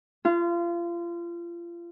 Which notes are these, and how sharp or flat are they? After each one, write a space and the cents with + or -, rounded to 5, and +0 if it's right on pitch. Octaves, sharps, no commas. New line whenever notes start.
F4 -30